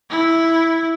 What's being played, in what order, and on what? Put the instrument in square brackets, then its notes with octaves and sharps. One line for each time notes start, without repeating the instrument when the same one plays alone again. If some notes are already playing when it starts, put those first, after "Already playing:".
[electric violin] E4